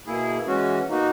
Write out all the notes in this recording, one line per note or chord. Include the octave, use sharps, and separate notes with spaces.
B2 A#3 E4 G#4
E3 G#3 C#4 F#4
B2 A#3 D#4 F#4